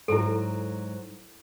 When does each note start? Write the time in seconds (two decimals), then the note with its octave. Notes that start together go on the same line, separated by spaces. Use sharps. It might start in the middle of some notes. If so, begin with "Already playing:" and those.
0.08 G#2 F#3 E4 A4